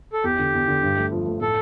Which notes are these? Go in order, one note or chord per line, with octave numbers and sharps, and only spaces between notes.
A4
E2 G4
D3
E2
D3
G2
A3
F3
A3
A2 A4